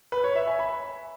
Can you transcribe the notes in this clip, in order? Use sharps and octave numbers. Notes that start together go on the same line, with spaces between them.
B4
C#5
E5
G#5
B5